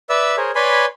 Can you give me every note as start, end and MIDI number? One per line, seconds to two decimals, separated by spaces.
0.09 0.36 71
0.09 0.36 74
0.09 0.36 76
0.09 0.36 88
0.37 0.51 68
0.37 0.51 70
0.37 0.51 72
0.37 0.51 73
0.55 0.85 71
0.55 0.85 73
0.55 0.85 74
0.55 0.85 80
0.55 0.85 83
0.55 0.85 84